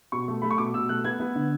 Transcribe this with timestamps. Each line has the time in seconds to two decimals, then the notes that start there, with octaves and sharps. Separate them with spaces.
0.12 B2 C#6
0.28 A3
0.42 A3 B5
0.51 C#6
0.58 B2 D6
0.74 B2 E6
0.89 A3 F#6
1.04 B3 G#6
1.20 B3
1.35 D3